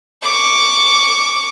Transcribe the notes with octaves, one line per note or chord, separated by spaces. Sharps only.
C#6 D6